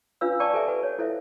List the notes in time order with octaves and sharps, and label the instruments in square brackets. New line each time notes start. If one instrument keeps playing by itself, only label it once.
[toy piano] C#4 D4 F4 B4 F5 E6
D5 G5 A5 A#5 C#6 D6
G4 A4 C5 E5 G#5
A4 B4 F#5 G#5
C#5
E4 A4 C5 E5 F5